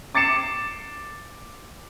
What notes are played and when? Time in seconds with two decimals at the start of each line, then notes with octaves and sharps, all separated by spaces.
0.15 D6 A6 C7 C#7 E7